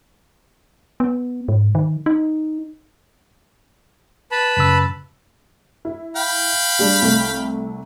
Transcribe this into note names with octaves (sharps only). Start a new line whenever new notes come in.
B3
G#2
D#3
D#4
B4 A5 B5
F#2 C#3 E6
E4
F5 G5 B5
G3 G#3 D4
C2 A3